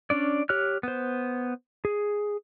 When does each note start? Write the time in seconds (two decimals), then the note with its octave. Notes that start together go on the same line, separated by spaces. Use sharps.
0.10 C#4 D4 D5
0.49 G4 C#5 F6 F#6
0.83 B3 C5
1.85 G#4